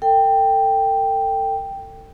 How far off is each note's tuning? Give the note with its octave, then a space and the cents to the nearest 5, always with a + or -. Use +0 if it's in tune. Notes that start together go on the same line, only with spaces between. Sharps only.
A4 +40 G5 +0